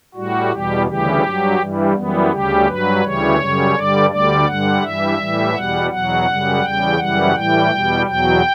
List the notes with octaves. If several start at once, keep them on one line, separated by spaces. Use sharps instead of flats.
A2 G3 F#4
E2 B2 G3 G4
D2 C#3 E3 G3 G4
G2 F#3
G2 E3 G3
F#2 E3 G3 B3
D2 C#3 G3 G4
G2 F#3 B4
D2 C#3 E3 G3 C#5
F#2 C#3 G3
G2 D3 G3 D5
D2 D3 G3 D5
G2 D3 G3 F#5
G2 E3 G3 E5
A2 E3 G3
E2 B2 G3 F#5
E2 B2 F#3 F#5
F#2 C#3 G3
E2 C#3 G3 G5
F#2 C#3 E3 G3 F#5
A2 E3 G3 G5
E2 B2 G3
E2 B2 F#3 G5